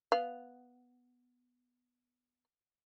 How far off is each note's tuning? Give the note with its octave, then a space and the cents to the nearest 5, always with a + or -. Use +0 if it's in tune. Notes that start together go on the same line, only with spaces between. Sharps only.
B3 +0 F5 +0